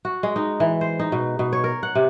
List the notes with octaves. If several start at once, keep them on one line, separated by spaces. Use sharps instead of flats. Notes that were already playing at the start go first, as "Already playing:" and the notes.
F#4
G#3
D#4
E3
C5
D#4
B2
B2
C#5
A#4
F#5
C3